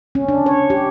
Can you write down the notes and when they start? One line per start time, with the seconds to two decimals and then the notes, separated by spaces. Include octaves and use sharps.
0.15 C#4
0.28 D4
0.46 C#5
0.70 G4